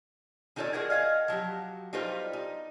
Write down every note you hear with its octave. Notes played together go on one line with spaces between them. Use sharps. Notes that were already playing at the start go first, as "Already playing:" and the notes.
D#3 D#4 F4 A4 C#5 D5
F#4 G#4 A#4 D5 F#5
D#5 F5 F#5 G#5
F3 F#3 F#4 G4
G3 D#4 F4 A4 B4 C5
D#4